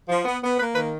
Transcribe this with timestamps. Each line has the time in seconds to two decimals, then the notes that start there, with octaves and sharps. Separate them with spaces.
0.09 F3
0.25 B3
0.42 B3
0.58 A#3 B4
0.75 D#3 B4